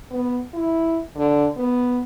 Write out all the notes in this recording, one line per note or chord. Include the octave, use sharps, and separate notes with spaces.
B3
E4
D3
B3